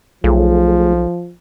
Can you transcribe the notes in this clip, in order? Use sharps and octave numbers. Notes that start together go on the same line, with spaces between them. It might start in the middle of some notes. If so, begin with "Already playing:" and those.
B1 F3 A3 F4 G#4